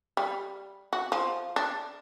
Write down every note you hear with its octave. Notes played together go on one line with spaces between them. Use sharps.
G3
F#4
F3
D4